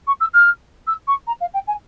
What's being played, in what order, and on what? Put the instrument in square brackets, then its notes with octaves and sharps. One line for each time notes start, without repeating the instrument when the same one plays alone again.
[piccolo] C#6
E6
F6
E6
C#6
A#5
F5
G5
G#5